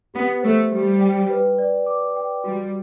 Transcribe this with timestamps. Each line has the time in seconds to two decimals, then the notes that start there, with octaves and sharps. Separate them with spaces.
0.14 B3 G4
0.43 A3 C5
0.72 G3 G4
1.01 G5
1.29 B4
1.58 D5
1.86 D6
2.16 G5
2.44 G3 F#4